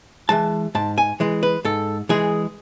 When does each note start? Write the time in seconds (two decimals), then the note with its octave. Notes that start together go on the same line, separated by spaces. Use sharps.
0.29 E3 G#3 A5
0.75 G#2 A5
0.98 G#5
1.20 E3 G#3
1.43 B4
1.65 G#2 A4
2.09 E3 G#3 G#4